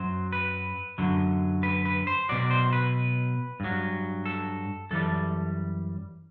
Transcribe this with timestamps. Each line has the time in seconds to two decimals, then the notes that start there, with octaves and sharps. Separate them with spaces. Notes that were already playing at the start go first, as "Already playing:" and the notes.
Already playing: F#2 F#3 C5
0.32 B4
0.98 F#2 D3 F#3
1.63 B4
1.85 B4
2.07 C5
2.29 B2 F#3 D5
2.51 C5
2.73 B4
3.60 G2 F#3
4.26 A4
4.91 F#2 E3 G3 A4